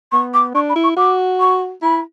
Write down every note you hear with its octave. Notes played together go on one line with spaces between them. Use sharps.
B3 C#6
D6
D4 C#6
B5
E4
C#6
F#4 D6
C#6
E4 B5